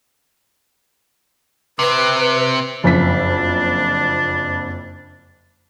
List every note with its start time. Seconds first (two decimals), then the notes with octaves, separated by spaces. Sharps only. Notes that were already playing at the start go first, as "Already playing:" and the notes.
1.79 C3 C4 B4
2.84 F#1 F2 D4 B6